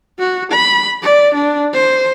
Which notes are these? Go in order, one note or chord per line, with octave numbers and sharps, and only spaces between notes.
F#4
B5
D5
D4
C5